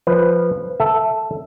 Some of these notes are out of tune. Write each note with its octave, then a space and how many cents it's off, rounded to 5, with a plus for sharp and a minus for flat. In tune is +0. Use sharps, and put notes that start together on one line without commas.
F3 +0 B4 +0
A4 +0 E5 +0